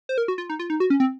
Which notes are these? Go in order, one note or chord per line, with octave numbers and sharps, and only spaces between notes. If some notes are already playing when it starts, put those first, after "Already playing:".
C5
A#4
F#4
F4
D#4
F4
D#4
F#4
C#4
C4